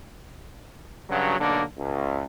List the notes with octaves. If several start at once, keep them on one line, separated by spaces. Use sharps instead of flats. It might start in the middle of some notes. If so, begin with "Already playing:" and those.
G2 C#3 F#3
B1 D3 A#3 D4
C#2